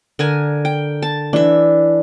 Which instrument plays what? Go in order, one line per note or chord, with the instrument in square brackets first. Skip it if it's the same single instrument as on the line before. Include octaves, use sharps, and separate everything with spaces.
[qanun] D3 A#4 G#5
G5
A5
[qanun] E3 E5 [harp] D4